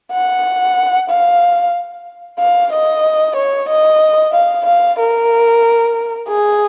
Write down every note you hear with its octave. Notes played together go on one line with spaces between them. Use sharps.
F#5
F5
F5
D#5
C#5
D#5
F5
F5
A#4
G#4